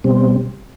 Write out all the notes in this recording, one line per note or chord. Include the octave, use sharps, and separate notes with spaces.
B2 G3 C4